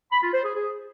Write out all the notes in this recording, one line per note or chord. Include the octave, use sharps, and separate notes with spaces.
B5
F4
C5
G#4
G#4